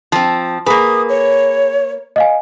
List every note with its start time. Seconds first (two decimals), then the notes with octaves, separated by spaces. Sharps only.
0.12 F3 C4 A5
0.66 A#3 G#4 B4 G#5 B5 D#6
1.09 C#5
2.16 D#5 F5 G#5